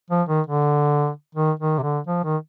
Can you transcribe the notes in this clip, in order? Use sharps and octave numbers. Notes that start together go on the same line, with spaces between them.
F3
D#3
D3
D#3
D#3
C3
D3
F3
D#3